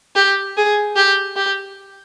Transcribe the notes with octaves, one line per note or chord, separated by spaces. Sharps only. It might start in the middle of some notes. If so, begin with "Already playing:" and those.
G4
G#4
G4
G4